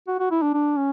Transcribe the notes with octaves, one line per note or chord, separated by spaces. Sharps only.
F#4
F#4
E4
D4
D4
C#4